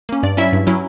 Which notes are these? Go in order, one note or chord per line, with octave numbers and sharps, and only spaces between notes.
A#3 C#4
G2 D5
F#3 C#4 E4 E5
G2
F#3 C#4 E4